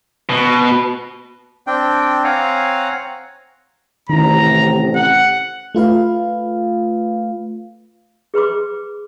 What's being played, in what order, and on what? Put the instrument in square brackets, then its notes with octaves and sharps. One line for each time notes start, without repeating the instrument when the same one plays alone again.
[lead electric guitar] B2
[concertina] C4 D4 G5
C4 C#5 F5 F#5 G#5 A#5
[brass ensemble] A1 C3 [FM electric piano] D#3 [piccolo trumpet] A#5
[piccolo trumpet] F#5
[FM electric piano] A3 F4 B4 F5
[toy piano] G#4 B4 C6 D6